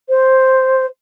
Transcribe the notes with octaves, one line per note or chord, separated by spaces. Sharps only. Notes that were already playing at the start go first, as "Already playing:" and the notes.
C5